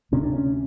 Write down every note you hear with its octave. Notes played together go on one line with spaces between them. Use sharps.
D2 C3 C#4
D4
C#4